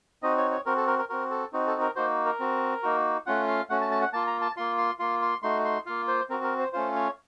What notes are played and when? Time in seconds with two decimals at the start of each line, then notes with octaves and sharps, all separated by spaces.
0.23 C4 D#4 F#4 D#5
0.37 C#5
0.51 C#5
0.66 C4 F#4 A#4
0.77 A4
0.87 A#4
0.99 A#4
1.09 C4 F#4 A#4
1.31 A4
1.53 C4 D#4 F#4
1.67 A4
1.81 A#4
1.96 A#3 D#4 F#4 C5
2.26 A#4
2.40 C4 F#4
2.83 A#3 D#4 F#4
3.26 A3 C#4 F4 F#5
3.48 F5
3.70 A3 C#4 F#4 F#5
3.81 A5
3.91 A5
4.02 F#5
4.13 A#3 F4 A5
4.27 A#5
4.41 A5
4.57 A#3 F4 C6
4.78 C6
4.99 A#3 F4 C6
5.22 C6
5.43 A3 D#4 F#4 C6
5.65 C6
5.86 A#3 F4 F5
6.08 C5
6.29 C4 F#4 A#4
6.44 A#4
6.59 C5
6.73 A3 C#4 F4 C5
6.95 C#5